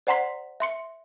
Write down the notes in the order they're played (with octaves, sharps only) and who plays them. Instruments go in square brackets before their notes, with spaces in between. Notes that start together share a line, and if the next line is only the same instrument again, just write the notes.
[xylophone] C5 D5 F#5 A#5 C6 B6
E5 C6 C#7